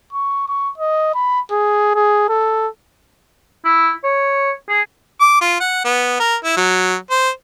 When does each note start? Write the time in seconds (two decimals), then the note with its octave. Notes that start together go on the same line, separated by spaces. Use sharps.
0.13 C#6
0.48 C#6
0.78 D#5
1.15 B5
1.52 G#4
1.95 G#4
2.29 A4
3.65 E4
4.04 C#5
4.69 G#4
5.21 D6
5.41 F4
5.60 F#5
5.85 B3
6.19 A#4
6.44 E4
6.57 F#3
7.10 C5